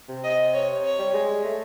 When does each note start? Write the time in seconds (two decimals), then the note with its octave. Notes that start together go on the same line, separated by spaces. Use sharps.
0.09 C3
0.24 D#5
0.53 C#5
0.84 C#5
0.99 G3
1.14 G#3
1.45 A3